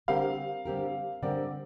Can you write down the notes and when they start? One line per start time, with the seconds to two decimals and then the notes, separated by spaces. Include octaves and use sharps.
0.08 D3 G3 C4 G4 A#4 F5
0.65 D3 G3 C4 G4 A#4
1.23 D3 G3 C4 G4 A#4 D5